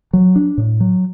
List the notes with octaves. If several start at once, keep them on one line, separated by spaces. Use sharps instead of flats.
F#3
D4
A2
F#3